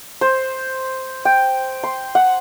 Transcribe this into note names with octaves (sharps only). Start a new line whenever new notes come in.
C5
G5
C6
F#5